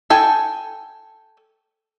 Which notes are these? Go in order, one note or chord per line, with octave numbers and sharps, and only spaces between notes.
A4 G5 G#5